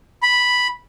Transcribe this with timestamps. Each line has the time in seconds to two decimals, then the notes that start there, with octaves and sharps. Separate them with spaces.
0.22 B5